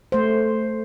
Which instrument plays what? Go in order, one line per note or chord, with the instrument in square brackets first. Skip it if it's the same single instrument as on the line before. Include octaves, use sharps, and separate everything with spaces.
[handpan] A3 C5